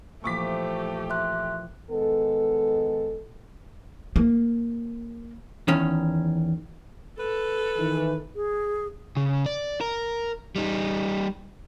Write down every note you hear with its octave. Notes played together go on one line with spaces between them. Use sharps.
A#2 E3 F3 A3 G4 C#6 D6 B6
E5 C6 F#6
D#3 G#3 B3 A4
A#3
E2 D#3 C#4
A4 B4
D#3 E3
G#4
C#3
D5
A#4
G3 D#4